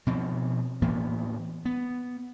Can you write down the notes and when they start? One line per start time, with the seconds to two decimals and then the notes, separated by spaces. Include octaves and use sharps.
0.07 B2 F3 C4
0.82 A2 E3 A#3 B3
1.65 B3